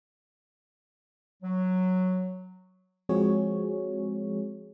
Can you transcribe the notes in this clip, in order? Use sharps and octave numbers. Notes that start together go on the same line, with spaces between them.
F#3
F3 G#3 C4 F#4 G#4 C#5